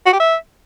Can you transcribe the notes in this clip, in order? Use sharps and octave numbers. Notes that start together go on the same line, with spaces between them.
F#4
G4
E5